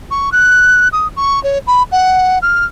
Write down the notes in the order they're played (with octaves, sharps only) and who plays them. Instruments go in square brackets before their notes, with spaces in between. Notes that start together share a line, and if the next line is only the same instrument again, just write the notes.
[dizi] C#6
F#6
D#6
C#6
C#5
B5
F#5
F6